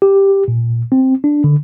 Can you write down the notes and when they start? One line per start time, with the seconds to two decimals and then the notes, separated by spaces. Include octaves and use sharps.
0.02 G4
0.48 A#2
0.92 C4
1.24 D4
1.44 D3